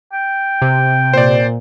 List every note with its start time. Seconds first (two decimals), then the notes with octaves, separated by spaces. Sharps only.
0.13 G5
0.62 C3
1.14 A#2 C5 D5